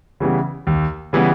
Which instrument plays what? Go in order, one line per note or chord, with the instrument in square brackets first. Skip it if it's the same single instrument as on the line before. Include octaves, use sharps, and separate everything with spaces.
[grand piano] C#3 E3 G3 B3
D#2
C#3 E3 G3 B3